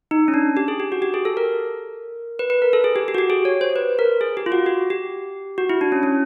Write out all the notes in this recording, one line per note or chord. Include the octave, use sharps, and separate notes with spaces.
D#4
C#4
D4
G4
G#4
G4
F#4
G4
G#4
A4
A#4
B4
B4
A#4
A4
G#4
G4
G4
F#4
G4
G#4
C#5
C5
B4
A#4
G#4
G4
F4
F#4
G4
G4
F#4
E4
D4
C#4
C#4